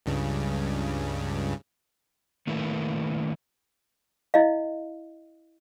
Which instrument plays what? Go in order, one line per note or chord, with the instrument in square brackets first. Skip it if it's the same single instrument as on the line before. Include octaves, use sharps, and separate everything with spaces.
[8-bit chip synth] C#2 G2 C#3
[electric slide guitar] D#3 A3 A#3 E4 A4 B4
[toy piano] E4 D#5 F5